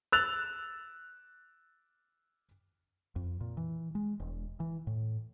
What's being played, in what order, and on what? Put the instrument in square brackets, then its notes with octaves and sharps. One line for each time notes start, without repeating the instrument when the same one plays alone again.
[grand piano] E6 F#6 A6 F7
[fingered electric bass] F2
A#2
E3
G#3
E1
E3
A2